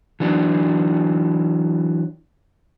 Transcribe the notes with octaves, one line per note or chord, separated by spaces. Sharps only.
E3 F#3 D4